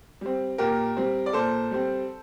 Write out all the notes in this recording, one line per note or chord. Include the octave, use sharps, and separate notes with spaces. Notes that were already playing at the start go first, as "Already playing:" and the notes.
G3 C4
A#2 G4 A#4
G3 C4
D5
A#2 A4 C5
G3 C4